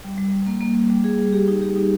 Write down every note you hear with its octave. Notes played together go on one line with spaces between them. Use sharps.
G3
G3
G3
A#3
A#3
A#3
G3
G#4
G3
G4
D#4
G4
D#4